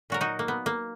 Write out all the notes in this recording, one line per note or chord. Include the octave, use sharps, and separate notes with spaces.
A#2 F#3 F#4 A#4
D#4 F#4
A#3
B3
A#3